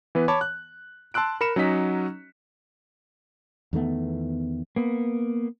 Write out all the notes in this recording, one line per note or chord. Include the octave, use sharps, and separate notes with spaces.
E3 B3 B4
C#5 A5 B5 D6
F#6
A5 C6 E6 F#6 D7
A#4 B5 C#7 E7
F#3 C#4 D#4 D#5 B6
E2 D#3 A3 B3
A#3 B3